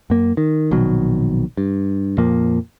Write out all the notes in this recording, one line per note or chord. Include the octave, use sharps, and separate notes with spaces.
F#2 A#3
D#3
A#1 B2 D#3 F#3
G2
F2 A#2 F3 A#3